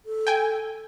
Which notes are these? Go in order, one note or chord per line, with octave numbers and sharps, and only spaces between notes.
A4
G5 G#5